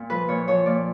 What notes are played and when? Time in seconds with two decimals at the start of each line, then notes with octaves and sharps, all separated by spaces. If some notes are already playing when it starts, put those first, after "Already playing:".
Already playing: A#2
0.10 F3 B4
0.28 A#2 C#5
0.47 F3 C#5
0.66 A#2 D5